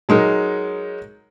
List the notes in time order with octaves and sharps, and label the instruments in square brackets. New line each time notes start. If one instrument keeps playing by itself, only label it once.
[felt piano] F#3 G#3 D#4 A#4